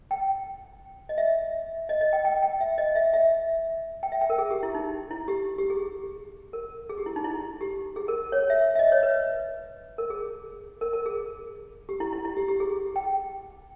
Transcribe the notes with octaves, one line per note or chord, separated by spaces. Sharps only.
G5
D#5
E5
D#5
D#5
G5
G5
G5
E5
D#5
E5
E5
G5
E5
G5
A#4
G#4
G4
E4
D#4
E4
G4
G4
G#4
A#4
G#4
G4
E4
D#4
E4
G4
G#4
A#4
C#5
E5
E5
D#5
C#5
B4
A#4
G#4
A#4
A#4
G#4
G4
E4
E4
E4
G4
G4
G#4
G5